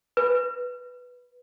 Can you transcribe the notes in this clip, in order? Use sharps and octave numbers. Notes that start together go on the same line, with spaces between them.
B4